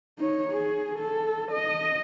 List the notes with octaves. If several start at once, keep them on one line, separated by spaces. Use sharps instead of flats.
D#4 C#5
G#4
A4
D#5